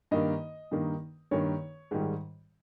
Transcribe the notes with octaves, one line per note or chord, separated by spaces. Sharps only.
G2 D#3 A#3 D#5
G2 D#3 A#3
G2 D#3 A#3 C#5
G#2 D#3 G3